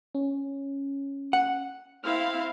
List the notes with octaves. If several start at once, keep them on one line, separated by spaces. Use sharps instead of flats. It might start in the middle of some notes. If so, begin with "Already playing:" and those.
C#4
F#5
C4 E4 F5 F6